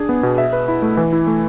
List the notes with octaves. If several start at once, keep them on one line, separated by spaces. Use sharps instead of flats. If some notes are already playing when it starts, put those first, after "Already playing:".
Already playing: D4 G#4
B3
B2
E5
B4
E4
A3
E3
E4
A3